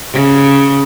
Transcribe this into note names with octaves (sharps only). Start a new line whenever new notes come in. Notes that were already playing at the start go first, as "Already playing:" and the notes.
C#3